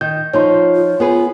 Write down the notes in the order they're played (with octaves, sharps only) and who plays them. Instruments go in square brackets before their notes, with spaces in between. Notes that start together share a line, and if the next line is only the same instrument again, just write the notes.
[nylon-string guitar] D#3 [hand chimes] G6
[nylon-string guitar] F3 D#4 [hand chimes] C#5 C6
[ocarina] F4
[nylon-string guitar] B3 G#4 B4